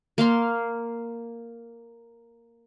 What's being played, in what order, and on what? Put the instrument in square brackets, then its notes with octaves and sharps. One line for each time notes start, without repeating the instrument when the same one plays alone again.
[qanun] A#3 F5 C6